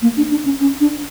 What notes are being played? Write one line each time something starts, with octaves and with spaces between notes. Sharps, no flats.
A#3
D4
D4
C#4
C#4
D4